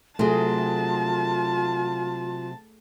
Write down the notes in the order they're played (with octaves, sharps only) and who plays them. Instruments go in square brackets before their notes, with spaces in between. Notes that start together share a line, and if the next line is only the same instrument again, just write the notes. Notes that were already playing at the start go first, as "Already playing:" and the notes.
[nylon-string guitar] C3 F#3 [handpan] A3 G#4 [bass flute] F4 [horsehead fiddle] A5